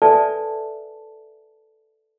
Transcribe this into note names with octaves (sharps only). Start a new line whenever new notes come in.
A4 B4 D5 E5 G#5 A5